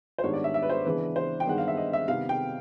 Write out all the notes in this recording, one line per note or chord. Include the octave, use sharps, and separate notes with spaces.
C5
G#2 D#3 G3 B3 D4 C#5
D5
E5
E5
B4
C5
C#3 E3 G#3 B3 D4 B4
C5
G5
G2 D#3 G#3 B3 D4 F#5
F5
E5
D#5
E5
C3 D#3 G3 B3 F5
G5